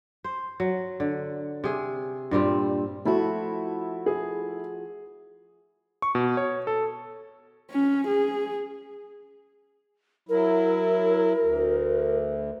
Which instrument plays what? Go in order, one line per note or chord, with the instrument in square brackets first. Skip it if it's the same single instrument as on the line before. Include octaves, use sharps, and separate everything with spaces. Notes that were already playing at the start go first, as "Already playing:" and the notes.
[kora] C5
F#3
D3
C3 G#4
G2 A#2 G3 C4
[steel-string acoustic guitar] F3 F#4 [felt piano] A3 E4
[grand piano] G#4
[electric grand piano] C#6
B2
C#5
A4
[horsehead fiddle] C#4
G#4
[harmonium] F#3 E4 [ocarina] A#4
[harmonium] D2